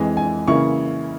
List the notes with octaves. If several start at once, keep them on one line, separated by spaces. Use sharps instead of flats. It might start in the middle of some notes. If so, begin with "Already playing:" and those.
Already playing: F2 E3 G#3
G#5
C#3 E3 A#3 E4 C#6